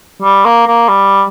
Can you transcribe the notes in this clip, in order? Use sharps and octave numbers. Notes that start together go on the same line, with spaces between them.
G3
A#3
A#3
G3